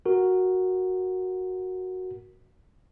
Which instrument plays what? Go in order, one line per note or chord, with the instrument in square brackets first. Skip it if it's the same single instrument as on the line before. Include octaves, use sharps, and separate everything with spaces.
[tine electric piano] F#4 A#4